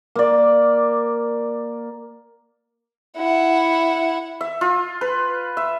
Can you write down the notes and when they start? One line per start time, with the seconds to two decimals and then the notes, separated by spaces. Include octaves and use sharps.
0.15 A#3 D5
3.17 E4 F#5
4.41 E5
4.61 F4
5.01 B4
5.57 E5